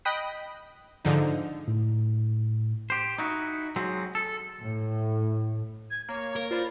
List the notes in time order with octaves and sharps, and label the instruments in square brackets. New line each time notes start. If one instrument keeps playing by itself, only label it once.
[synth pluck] D#5 G5 B5 D#6 F#6 B6
G#2 D3 F3 D#4
[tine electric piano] A2
[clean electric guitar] G4 C5
D#4 E4 F#4
F#3 G#3 C4
A4
[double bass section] A2
[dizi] G#6
[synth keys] A#3 [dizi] C#5
[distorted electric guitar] A#4
[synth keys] F4 C5 B5 [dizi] D5